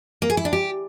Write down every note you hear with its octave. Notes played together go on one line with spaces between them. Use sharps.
A#3
G#4
E4
D4
G4